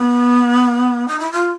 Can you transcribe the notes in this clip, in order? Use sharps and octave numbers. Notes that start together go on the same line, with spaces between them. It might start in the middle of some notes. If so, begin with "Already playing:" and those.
Already playing: B3
D#4
E4
F4